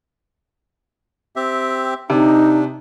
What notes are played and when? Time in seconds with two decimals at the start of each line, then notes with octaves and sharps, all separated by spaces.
1.36 C4 G4 E5
2.10 C3 D4 D#4